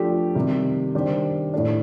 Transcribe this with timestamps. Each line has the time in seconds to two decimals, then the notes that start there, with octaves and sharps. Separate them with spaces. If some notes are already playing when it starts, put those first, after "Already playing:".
Already playing: F3 A3 D4 G4
0.35 C3 D#3 G3
0.95 D#3 G3 D4 G4 C5
1.54 A2 A3 D4